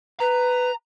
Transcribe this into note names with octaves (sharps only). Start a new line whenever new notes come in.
B4 A#5